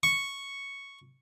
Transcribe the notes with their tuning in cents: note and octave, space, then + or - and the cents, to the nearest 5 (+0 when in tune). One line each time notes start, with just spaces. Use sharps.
C#6 +0